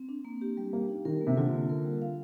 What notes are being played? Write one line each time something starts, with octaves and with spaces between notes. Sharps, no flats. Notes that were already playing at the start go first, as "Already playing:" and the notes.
Already playing: C4
D4
A#3
G4
G3
A#3 G4
D#4
D#3 A#4
A#3
C3
D3 F4
A#3
A#4
G3
F5